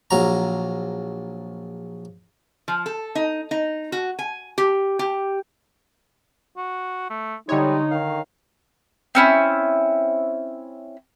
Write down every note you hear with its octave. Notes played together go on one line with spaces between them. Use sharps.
A#1 F#3 A#5
F3
A4
D#4
D#4
F#4
G#5
G4
G4
F#4
A3
D3 G3 G#3 D#4 C#5
D#3 F5
C4 C#4 E4